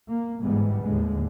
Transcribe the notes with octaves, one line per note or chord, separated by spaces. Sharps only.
A#3
G1 G#2 E3 G3 G#3 B3
D#2 A2 D3 G#3